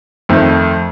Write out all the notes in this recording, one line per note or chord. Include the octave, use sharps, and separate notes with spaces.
F2 D#3 A3